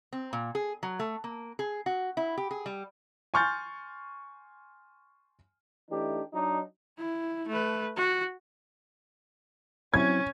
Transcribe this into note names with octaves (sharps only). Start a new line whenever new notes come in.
C4
A#2
G#4
F#3
A3
A#3
G#4
F#4
E4
G4
G#4
G3
G#5 C6 C#6 F6 G6 A6
E3 A3 D4 D#4 G4
F#3 D4 D#4
E4
A3 B4
F#4
F#3 C4 C#4 E4 G#6